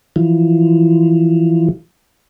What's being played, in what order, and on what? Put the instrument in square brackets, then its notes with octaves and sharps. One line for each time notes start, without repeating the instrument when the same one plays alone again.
[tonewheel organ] E3 F3